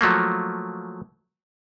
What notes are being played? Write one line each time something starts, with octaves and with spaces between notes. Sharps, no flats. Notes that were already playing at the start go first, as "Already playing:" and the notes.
F3 F#3 A3 A#3